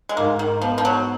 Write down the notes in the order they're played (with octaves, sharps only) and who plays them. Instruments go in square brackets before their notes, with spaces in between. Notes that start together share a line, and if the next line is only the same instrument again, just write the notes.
[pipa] G#3
[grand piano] G#2 [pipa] A#3
[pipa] D#3
[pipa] F3 [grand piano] B3
[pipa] F3
F#3